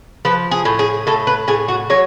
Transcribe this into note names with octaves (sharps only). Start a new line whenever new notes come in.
F3 B4
G#4
A2
G#4
A2 A4
B4
A2 G#4
F#4
F#3 C#5